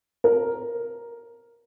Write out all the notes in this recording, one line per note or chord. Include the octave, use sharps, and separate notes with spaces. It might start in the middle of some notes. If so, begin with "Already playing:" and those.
A#4